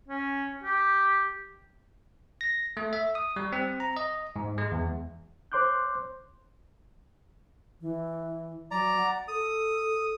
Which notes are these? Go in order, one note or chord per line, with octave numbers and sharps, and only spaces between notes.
C#4
G4
A#6
A3
E5
D#6
G3
C4
A#5
D#5
G#2
G#3
E2
C5 C#5 C6 D6 F#6 G6
E3
F#3 D5 A#5
F#5
A4 D#6